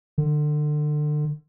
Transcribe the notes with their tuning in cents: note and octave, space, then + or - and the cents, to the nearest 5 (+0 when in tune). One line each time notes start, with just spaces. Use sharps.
D3 +30